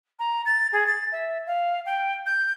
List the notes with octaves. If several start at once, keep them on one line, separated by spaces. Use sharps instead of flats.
A#5
A6
G#4
A6
E5
F5
G5
G6